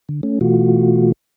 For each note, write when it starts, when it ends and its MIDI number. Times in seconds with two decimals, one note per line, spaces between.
0.09 0.21 50
0.23 0.39 57
0.23 0.39 61
0.41 1.12 47
0.41 1.12 52
0.41 1.12 57
0.41 1.12 65
0.41 1.12 66